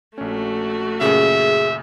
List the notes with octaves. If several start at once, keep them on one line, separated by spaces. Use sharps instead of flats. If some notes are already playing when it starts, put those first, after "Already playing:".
A#1 A3 C#4 F#4
F#2 A#2 C#3 G#4 E5